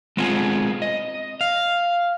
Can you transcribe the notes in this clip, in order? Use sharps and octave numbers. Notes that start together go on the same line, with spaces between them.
G#3 B3 C4 F4 G4 G#4
D#5
F5